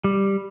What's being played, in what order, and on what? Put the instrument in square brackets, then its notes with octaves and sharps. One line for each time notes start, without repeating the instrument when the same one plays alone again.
[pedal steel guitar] G3